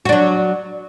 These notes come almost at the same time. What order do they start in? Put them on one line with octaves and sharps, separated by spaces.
F#4 D4 F#3